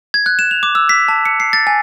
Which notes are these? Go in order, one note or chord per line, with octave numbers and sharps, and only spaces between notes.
G#6
F#6
E7
F7
D6
E6
B6
A5
C#7
C7
A6
G#5